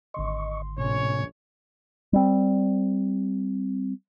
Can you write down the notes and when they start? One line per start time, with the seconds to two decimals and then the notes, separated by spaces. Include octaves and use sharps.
0.14 G#1 D3 D#5 C6 C#6
0.78 A#1 A2 C3 C#4 C#5
2.13 G3 C4